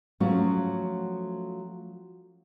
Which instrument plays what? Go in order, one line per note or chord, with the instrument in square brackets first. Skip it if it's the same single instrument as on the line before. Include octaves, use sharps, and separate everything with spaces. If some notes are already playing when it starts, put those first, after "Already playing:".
[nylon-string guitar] F3 F#3 A3 C#4 F#4